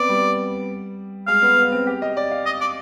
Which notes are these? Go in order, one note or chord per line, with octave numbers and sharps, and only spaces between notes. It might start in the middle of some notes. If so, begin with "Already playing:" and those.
Already playing: B3 C4 D5
G3
G#3 F5
B3
B3
C4
G4
D#5
D5
F5
D#5
D5